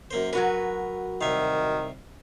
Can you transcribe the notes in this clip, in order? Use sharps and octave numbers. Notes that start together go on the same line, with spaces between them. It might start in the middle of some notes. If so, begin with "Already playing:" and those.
F#2 A#3 C5
F#3 F#4 A#4 B4
C2 D#3 E5 F5